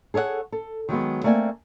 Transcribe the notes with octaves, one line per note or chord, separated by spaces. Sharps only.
G#4 A4 C#5 D#5 F#5
A4
D#3 F#3 G#3 B3
A3 A#3 C4 D5 G#5